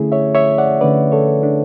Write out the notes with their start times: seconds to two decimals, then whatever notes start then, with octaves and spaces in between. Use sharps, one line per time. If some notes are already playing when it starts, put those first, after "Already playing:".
Already playing: D3 A3 C#4 E4 G#4
0.12 C#5 E5
0.35 C#5 E5
0.58 D5 F#5
0.81 D3 A3 C#4 B4 D5
1.12 A4 C#5
1.43 D4